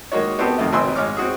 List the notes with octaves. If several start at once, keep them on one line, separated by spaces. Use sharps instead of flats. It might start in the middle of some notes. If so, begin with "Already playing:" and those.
D#3 G#3 A#3 F#4 C#5
B3 C4 F#4 G4 A4 C5
F2 C3 D#3 A3
G#1 C4 B4 G#5 C6 E6
G#2 C#5 D6 F6
C4 F#4 G#4